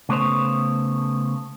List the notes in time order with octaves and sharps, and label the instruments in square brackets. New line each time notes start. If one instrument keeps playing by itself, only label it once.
[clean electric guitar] C#3 A3 B3 C5 C#5